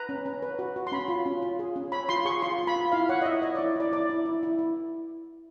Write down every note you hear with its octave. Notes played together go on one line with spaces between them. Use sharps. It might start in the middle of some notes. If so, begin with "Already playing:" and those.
Already playing: B4 A#5
C#4
C#4
B4
F#4
F#4
C6
C#4 B5
F4
C#4
F4
G#4
C#4
C#5 B5
F4 C6
G#4 C#6
F4 C6
F4
B5
F4
E4 F5
C#5 F#5
D#5
E4 E5
C#5 D#5
E4 D5
E4 D5
E4 D5
E4
E4
E4
E4